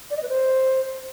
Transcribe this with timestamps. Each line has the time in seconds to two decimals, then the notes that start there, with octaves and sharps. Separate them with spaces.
0.11 D5
0.17 D#5
0.23 B4
0.29 C5